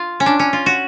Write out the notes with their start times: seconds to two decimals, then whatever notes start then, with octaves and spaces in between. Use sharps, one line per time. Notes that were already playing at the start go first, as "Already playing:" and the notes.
Already playing: F4
0.20 C#4
0.26 D4
0.39 C#4
0.53 F4
0.66 F#4